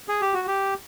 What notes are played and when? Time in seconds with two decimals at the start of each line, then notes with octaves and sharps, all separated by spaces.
0.09 G#4
0.21 G4
0.34 F#4
0.47 G4